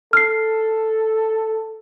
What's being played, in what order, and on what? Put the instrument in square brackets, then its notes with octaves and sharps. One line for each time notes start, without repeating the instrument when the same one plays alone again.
[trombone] A4 [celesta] F6 C7